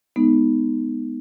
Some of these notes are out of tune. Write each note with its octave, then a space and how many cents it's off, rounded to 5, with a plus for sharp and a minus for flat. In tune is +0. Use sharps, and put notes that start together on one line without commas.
G#3 +0 B3 +0 D#4 +0